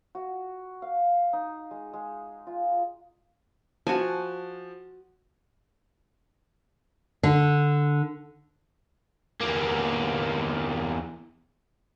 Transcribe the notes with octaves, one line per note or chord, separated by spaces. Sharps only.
F#4
F5
D#4
G#3
G#3
F4
F3 F#4 G#5 A5
D3
E2 A#3